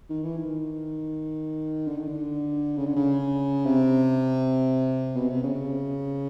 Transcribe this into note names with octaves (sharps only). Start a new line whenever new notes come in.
D#3
E3
D#3
D3
D#3
D3
C#3
D3
C#3
C3
B2
C3
C#3